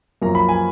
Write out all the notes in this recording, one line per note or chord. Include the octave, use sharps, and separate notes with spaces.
F#2 F3 A#3 A#5
B5
G#5